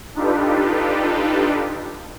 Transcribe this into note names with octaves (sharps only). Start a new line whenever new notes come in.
D4 D#4 F4 G4 A4 B4